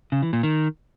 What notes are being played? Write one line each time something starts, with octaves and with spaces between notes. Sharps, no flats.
C#3
E3
A#2
D#3